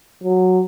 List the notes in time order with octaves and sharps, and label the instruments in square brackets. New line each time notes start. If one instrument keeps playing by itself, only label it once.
[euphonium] F#3